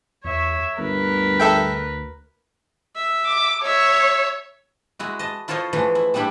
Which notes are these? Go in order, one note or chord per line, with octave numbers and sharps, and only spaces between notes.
E2 C#5 E5
G1 D2 A#4 B4
A4 E5 G5
E5
D6
C#5 E5
G#3 E4 F#4
D#5 A5
E4 F4 A4 C5 C#5 D#5
E3 F3 G#3 A3
E4
G3 B3 D4 E4 G4 B5